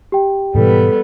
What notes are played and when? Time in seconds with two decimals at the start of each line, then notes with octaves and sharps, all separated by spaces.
0.12 G4 G5
0.55 G#2 B2 E3 G3 B3 A4